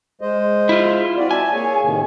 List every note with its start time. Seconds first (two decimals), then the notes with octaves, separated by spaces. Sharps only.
0.21 G#3 C5 D#5
0.69 E4 F4
1.17 C4 F#4 D5
1.31 E5 G#5 A5
1.53 A#3 G#4 C#5
1.83 A2 C3 D#3